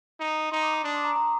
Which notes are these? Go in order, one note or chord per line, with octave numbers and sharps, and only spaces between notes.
D#4
D#4 C6
D6
D#6
D4 D6
C6
A#5
A#5